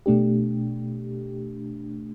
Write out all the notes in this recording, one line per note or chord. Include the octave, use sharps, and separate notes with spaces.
B2 A3 D4 G4